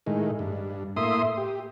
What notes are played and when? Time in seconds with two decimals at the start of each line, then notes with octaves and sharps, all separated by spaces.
0.07 A2 D#3 G#3
0.39 G2
0.96 A2 A#3 E5 C6 D#6
1.37 G4